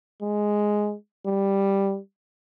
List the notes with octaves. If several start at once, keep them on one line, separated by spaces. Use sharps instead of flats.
G#3
G3